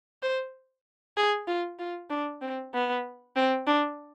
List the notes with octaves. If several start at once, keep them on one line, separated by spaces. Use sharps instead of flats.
C5
G#4
F4
F4
D4
C4
B3
C4
D4